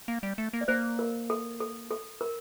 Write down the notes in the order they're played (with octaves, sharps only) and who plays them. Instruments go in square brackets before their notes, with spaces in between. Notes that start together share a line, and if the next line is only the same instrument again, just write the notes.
[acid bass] A#3
G3
A3
A#3
[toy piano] D5
[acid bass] A#3 [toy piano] C5
[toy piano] A#4
A4
A4
A4
A#4